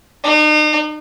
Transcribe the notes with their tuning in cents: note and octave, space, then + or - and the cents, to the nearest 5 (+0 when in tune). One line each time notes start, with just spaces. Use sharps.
D#4 -40